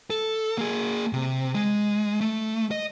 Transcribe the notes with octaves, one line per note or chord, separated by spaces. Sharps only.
A4
A#3 G#4
C3
G#3
A3
D#5